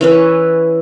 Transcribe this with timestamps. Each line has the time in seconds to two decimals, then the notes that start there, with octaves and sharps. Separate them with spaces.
0.01 E3 C#4 B4